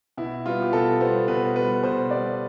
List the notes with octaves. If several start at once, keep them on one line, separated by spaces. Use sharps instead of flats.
B2 E4
G3 B3 F4
G4
B2 A4
G3 B3 C5
B2 B4
G3 B3 B4
B2 C5
G3 B3 D5